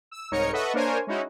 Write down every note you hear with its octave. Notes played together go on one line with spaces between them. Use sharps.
E6
C2 G#2 D#4 A#4 C#5 C#7
A4 B4 D#5 E5 F#5 C#6
A#3 D4 A#4 C5 C#5 G#5
G#3 C#4 D#4 E4 F#4